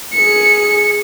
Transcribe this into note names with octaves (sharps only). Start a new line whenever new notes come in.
G#4 C#7